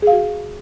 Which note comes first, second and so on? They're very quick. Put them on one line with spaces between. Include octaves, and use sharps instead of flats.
G#4 F5 F#4